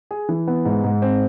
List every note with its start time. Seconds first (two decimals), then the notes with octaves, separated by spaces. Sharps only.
0.11 G#4
0.29 E3
0.47 B3
0.65 G#2
0.83 G#2
1.02 C4